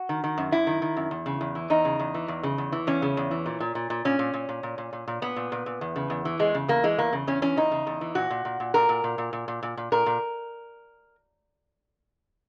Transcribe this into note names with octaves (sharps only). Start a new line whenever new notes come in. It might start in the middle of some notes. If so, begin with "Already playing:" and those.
Already playing: F#4
D#3
D#3
F#2
F#2 E4
D#3
D#3
F#2
E2
C#3
E2
E3
E2 D#4
C#3
E2
E3
E2
C#3
E2
E3
E2 C#4
C#3
E2
E3
A#2
A#2
A#2
A#2
A#2 C#4
A#2
A#2
A#2
A#2
A#2
A#2
A#2
A#2 B3
A#2
A#2
A#2
E2
C#3
E2
E3
E2 G#3
C#3
E2 A#3
E3 G#3
E2 A#3
C#3
E2 C#4
E3 C#4
E2 D#4
C#3
E2
E3
A#2 F#4
A#2
A#2
A#2
A#2 A#4
A#2
A#2
A#2
A#2
A#2
A#2
A#2
A#2 A#4
A#2